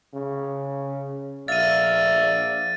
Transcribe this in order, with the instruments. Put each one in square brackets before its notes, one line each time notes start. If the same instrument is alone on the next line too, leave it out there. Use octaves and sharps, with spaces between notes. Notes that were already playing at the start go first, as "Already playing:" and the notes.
[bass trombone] C#3
[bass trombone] A#1 [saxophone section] D5 E5 F5 [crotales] A6 D#7